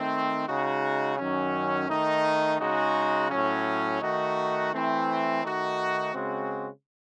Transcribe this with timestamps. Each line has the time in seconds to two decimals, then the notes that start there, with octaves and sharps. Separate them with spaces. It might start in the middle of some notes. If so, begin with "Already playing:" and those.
Already playing: D#3 A3 C4
0.46 C#3 G#3 D#4 F#4
1.17 F#2 D#3 F#3 C#4
1.88 D#3 A3 D#4
2.59 C#3 G#3 D#4 F#4
3.30 A2 F#3 C#4
4.01 D#3 A3 D#4 F#4
4.72 E3 A3 C4
5.43 D#3 A3 D#4 F#4
6.14 C#3 G#3 C4 F#4